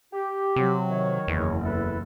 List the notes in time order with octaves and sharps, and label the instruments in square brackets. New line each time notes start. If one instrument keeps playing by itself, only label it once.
[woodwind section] G4
[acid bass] C3 [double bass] F#3
[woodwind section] D#3 C#5
[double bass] F#1 [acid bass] E2
[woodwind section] E4 A4 B4